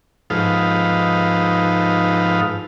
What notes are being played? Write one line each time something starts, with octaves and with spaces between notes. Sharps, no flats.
G#2 F3 D#4 A4 B4 F5